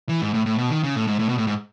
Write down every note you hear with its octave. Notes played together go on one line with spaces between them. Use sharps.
E3
G#2
A2
A2
B2
D#3
C#3
A2
G#2
A2
B2
A2
G#2